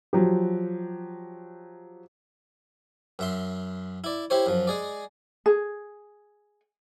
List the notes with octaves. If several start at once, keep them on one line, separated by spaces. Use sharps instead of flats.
F3 F#3 G4
F#2 E5 C6
E4 D5
E4 G4 C5 C#5
F#2 F3
G#3 G#4 D5
G#4